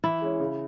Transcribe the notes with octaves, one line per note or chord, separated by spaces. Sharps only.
E3 E4
G#3 C#4
C#3